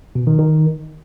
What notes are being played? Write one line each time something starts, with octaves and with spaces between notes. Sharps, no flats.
B2
D#3
D#3